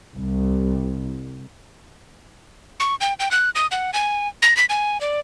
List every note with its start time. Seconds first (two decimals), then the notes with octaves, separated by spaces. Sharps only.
0.15 C2
2.80 C#6
3.01 G5
3.20 G5
3.31 F#6
3.55 D#6
3.72 F#5
3.94 G#5
4.42 A#6
4.57 B6
4.70 G#5
5.01 D5